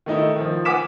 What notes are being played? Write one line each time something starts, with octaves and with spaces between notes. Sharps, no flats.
D#3 A3 D#4 E4
D#3 F3
F#5 G#5 D6 B6 E7